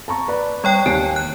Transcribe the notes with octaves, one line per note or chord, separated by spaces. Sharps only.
A5 A#5 C#6
B4 D5
G3 C#5 G5 C#6 F#6
D#2 G#5 C7 D7
F#6